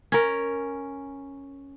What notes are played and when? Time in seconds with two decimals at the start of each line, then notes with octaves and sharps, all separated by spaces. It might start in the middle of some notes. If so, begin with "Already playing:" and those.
0.12 C#4 A#4